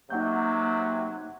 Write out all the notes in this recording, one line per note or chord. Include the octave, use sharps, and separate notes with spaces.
C3 F#3 A#3 D#4 F#5 G6